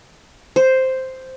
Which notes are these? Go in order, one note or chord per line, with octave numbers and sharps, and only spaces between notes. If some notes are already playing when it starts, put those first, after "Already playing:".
C5